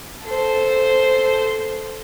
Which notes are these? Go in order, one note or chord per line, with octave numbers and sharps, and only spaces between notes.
A4 C5